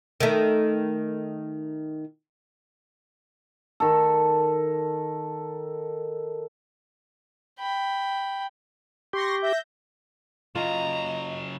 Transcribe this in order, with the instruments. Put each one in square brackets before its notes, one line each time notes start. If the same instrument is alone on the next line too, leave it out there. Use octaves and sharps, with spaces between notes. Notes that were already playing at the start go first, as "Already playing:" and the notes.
[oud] D#3 A3
[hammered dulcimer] D#3 A4
[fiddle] G5 B5
[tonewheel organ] G4 [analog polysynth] C6 C#6 A#6
[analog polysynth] E5 G6 A#6
[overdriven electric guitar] C#3 F#3 [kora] F4 [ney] D#5 [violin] A#5